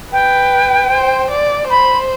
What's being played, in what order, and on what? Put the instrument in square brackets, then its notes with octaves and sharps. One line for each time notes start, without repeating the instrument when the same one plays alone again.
[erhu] B4 [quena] G5
[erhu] C5
D5
[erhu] C5 [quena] B5